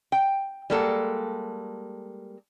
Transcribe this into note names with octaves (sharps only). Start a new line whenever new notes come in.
G5
G3 G#3 A#3 D4 A4 F#5